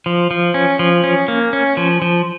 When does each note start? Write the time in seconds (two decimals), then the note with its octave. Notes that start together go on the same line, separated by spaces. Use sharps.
0.06 F3
0.31 F3
0.54 C#4
0.79 F3
1.04 C#4
1.28 A#3
1.53 C#4
1.77 F3
2.02 F3